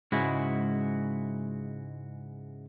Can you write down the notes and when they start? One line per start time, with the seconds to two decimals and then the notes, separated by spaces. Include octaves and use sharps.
0.12 G#2 C#3 G#3 E4 F#4